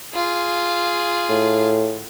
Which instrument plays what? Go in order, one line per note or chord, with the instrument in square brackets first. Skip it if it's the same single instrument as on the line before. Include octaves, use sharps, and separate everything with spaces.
[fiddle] F4 G#4
[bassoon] A2